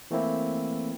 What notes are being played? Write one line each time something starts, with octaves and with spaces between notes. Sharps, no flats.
E3 A3 A#3 C4 E4